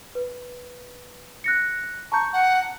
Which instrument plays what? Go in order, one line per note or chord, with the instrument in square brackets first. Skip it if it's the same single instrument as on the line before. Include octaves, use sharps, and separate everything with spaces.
[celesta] B4
F#6 A#6 C#7
[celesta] A5 A#5 G6 [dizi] C#6
[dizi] F#5